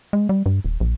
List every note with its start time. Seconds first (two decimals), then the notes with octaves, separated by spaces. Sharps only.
0.13 G#3
0.29 G3
0.46 G2
0.64 D#1
0.80 A#1